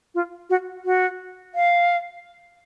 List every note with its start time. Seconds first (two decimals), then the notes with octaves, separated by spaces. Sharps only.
0.15 F4
0.50 F#4
0.85 F#4
1.55 F5